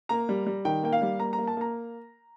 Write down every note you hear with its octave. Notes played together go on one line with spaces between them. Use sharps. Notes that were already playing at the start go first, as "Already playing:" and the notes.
A#3 A#5
G3
G3
D#3 G5
A#3 G5
F5
G3
A#3 A#5
A#5
A#3
A5
A#3 A#5